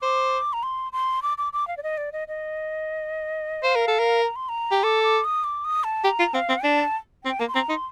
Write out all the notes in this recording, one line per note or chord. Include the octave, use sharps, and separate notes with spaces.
C5 D6
A#5
C6
C6
D6
D6
D6
F5
D5
D#5
D5
D#5
D#5
C5 F5
A#4
A4
A#4
A#5
C6
A#5
G4
A4 D6
D6
D#6
D6
D#6
A5
G4 A#5
F4
C4 F5
C4
D4 A5
C4 G5
A#3 A#5
C6
C4 A#5
D#4 C6